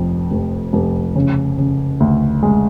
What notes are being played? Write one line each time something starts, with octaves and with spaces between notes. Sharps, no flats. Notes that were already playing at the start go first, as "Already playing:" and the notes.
Already playing: F1 F2
F1
F1
C#3
C#3
D2
G#3